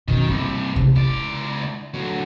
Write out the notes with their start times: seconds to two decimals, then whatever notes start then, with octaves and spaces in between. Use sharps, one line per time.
0.08 F#2 B2 D#3
0.28 G2 C3 F3
0.76 A1 C3
0.95 C#2 E4 D5
1.94 D3 F#3